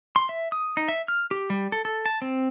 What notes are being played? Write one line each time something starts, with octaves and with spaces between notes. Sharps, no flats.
C6
E5
D#6
D#4
E5
F6
G4
G3
A4
A4
A5
C4